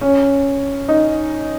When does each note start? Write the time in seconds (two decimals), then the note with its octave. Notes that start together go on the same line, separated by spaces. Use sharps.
0.01 C#4
0.89 D#4